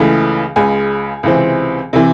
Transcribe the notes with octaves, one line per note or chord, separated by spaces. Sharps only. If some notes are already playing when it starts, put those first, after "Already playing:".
Already playing: C#2 C#3 E3 A3
C#2 C#3 G#3 G#5
C#2 C3 E3 C4
C3 E3